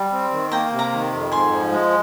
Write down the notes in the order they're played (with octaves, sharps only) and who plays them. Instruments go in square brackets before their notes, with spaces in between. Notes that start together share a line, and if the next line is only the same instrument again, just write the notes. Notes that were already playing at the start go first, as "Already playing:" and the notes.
Already playing: [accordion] G3 [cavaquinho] G5 A#5
[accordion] C4
D#3
[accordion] A#3 [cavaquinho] G5 A#5
[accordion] C3
[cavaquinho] A#5 D6
[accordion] D#3
F2
[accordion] G#2 [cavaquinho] G#5 C6
[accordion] F3
G#3